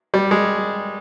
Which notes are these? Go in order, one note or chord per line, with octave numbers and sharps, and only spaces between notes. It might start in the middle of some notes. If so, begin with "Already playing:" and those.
G3
G#3